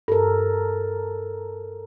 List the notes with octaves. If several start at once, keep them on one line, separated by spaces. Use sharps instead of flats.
G2 A4 A#4